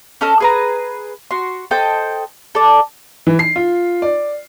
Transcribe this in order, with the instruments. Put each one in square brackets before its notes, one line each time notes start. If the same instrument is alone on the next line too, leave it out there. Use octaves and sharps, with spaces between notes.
[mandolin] C#4 A4 D#5 F6
G#4 B4 A#5
F#4 C6
A4 C5 D#5 G5
A4 D5
[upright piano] E3
C7
F4
D5